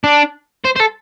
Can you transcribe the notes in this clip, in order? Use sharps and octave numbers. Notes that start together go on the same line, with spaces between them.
D4
C5
C5
A4